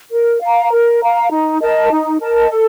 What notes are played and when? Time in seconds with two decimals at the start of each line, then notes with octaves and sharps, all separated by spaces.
0.11 A#4
0.41 F5 A#5
0.71 A#4
1.01 F5 A#5
1.31 D#4
1.60 A#4 D#5 A5
1.90 D#4
2.20 A#4 D#5 A5
2.50 A4